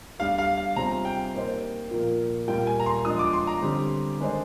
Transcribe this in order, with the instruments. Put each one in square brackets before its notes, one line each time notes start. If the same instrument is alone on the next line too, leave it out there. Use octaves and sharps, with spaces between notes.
[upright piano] G3 D4 G4 [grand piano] F5
[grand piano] F5
F5
[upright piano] C3 G3 C4 F4 G#4 [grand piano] A#5
[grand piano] G5
[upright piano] A#3 D#4 G4 C5
A#2 F3 A#3
[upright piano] A#2 G3 A#3 F4 [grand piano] G5
[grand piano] G#5
A#5
C6
[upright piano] F3 G#3 D4 [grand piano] D#6
[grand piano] D6
C6
A#5
[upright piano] D3 G3 C4 G4
D#3 G#3 D4 G#4 C5